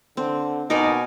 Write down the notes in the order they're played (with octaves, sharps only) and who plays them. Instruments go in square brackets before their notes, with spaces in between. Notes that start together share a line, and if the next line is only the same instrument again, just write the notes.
[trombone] D3 [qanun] C4
[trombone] B2 [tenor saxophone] D#4 [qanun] A#4 D5 G#5